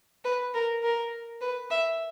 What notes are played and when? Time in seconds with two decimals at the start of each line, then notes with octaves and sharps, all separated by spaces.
0.24 B4
0.54 A#4
0.83 A#4
1.41 B4
1.70 E5